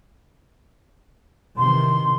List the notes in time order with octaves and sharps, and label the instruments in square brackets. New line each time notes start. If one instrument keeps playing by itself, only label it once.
[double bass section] C3 D#3 E3 [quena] C6